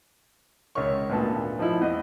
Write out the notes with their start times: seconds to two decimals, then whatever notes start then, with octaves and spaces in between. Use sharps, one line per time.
0.75 C#2 A#4 C#5 C#6
1.09 G#1 D2 A#2 A#3 B3 A5
1.59 F3 D#4 E4
1.81 E2 D#5